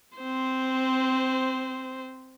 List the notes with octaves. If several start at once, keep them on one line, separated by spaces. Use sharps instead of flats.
C4 C5